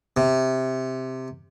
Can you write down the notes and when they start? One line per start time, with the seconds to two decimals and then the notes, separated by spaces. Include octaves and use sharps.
0.17 C3